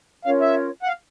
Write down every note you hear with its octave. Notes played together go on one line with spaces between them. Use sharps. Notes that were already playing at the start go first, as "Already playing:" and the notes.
C#4 F4 A#4 C#5 F5
E5
F#5
F5